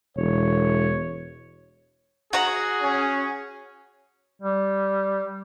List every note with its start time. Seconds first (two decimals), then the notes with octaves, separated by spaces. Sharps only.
0.17 E1 C#5
2.33 F#4 G#4 A#5
2.82 C#4
4.42 G3